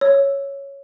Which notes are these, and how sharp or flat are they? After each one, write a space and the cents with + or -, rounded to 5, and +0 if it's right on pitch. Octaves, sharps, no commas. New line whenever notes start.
C#5 +0 E6 +0